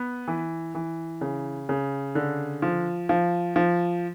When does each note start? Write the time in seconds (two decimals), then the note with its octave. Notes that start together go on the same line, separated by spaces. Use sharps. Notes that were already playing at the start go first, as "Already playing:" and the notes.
Already playing: B3
0.28 E3
0.75 E3
1.21 C#3
1.69 C#3
2.15 D3
2.62 F3
3.09 F3
3.56 F3